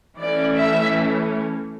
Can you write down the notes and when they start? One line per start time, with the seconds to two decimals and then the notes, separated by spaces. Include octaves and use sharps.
0.20 E3 A3 C#4 D5
0.57 E5